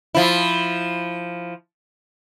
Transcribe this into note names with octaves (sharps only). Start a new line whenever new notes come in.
F3 E4